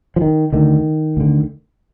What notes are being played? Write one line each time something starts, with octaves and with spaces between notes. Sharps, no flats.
F3
D#3
D2 D3 D#3
D2 D3